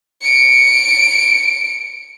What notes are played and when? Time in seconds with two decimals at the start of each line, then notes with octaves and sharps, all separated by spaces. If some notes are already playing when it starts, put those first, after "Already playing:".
0.22 C#7 D7